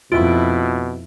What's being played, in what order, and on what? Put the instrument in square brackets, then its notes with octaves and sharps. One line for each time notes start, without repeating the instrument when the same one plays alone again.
[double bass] F2 E4 [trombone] B2 [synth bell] F4 D7